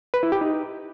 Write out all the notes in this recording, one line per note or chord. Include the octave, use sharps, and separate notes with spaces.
B4
E4
G4
D#4